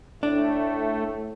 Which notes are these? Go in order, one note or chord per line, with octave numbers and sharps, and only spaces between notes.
A2 A3 D4